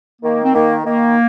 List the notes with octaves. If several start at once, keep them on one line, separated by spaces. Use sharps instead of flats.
D#3 A#3
C4
D#3 A#3
D#3 A#3